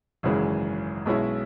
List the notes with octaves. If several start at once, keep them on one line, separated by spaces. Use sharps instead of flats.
G#1 F#2 C#3 E3 G#3
B1 B2 G#3 C#4 E4